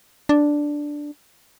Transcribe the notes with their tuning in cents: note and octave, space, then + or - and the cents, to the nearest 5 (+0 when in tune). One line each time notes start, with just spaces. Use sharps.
D4 +0